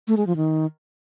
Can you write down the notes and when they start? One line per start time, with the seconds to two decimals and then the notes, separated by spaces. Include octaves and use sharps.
0.08 A3
0.17 G#3
0.27 F3
0.36 D#3